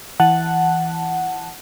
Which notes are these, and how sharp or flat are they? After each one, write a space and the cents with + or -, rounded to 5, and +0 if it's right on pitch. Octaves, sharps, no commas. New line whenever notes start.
E3 +0 F#5 +0 A5 +0